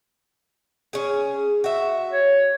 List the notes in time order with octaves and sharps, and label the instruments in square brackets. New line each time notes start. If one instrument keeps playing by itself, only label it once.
[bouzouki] C#4 G#4
F#4 E5
[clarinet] C#5